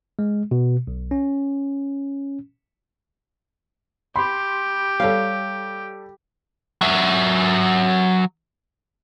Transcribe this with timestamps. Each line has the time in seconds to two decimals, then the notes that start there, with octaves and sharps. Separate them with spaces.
0.19 G#3
0.51 B2
0.87 B1
1.11 C#4
4.16 G4 B5 C6
5.00 G3 A4 C#5 F5
6.81 F#3 E5